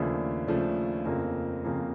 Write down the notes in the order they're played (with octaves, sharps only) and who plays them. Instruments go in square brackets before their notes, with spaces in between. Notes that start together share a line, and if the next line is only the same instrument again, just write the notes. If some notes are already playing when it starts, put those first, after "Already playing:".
Already playing: [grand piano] D#2 C#3 F3 A3 D4
D#2 C#3 F3 A3 D4
F2 C#3 F3 A#3
F2 C#3 F3 A#3